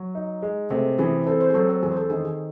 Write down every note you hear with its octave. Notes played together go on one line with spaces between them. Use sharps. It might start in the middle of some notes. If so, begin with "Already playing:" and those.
Already playing: F#3
D#4
G#3
C3 A3
E3 G#4
C4 A4
C5
G#4
F#3 A4
C4
E2 G#4
C5
A4
D#3 G#4
G#4